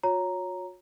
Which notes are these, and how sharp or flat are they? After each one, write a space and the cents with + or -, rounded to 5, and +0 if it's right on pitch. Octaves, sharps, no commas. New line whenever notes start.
F#4 -45 C#5 +0 A#5 +0